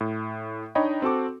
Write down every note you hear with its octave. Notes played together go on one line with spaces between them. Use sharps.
A2
D4 D#4 C#5 D#5 G5 B5
C4 F#4 A4 D6